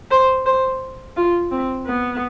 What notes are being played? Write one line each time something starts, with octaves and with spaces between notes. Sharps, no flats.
C5
C5
F4
C4
B3